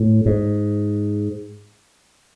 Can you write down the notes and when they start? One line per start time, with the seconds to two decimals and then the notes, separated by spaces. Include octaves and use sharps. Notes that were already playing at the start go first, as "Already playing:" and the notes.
Already playing: A2
0.26 G#2